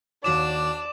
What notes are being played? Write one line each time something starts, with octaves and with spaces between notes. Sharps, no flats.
D#2 D4 F#4 C#5 D5 D6 E7